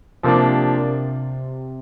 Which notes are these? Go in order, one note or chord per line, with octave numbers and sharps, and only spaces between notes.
C3 F3 A#3 D4